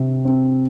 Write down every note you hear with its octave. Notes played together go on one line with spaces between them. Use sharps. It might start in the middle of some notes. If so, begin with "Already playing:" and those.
Already playing: C3 C4
C4